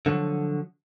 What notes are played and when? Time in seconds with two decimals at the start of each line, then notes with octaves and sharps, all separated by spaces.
0.06 D3 F3 F#3